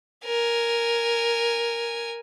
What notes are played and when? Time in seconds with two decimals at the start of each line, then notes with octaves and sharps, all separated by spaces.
0.25 A#4 G#5